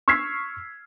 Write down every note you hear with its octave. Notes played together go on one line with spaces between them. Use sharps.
C#6 E6 F6 G#6 B6 C7